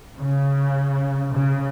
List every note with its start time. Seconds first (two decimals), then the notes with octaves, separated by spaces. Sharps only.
0.18 C#3
1.33 C#3